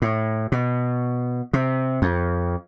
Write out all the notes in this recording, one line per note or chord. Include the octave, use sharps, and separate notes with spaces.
A2
B2
C3
F2